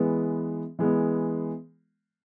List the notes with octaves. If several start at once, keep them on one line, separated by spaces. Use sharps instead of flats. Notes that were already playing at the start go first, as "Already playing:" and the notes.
Already playing: E3 G#3 B3
E3 G#3 B3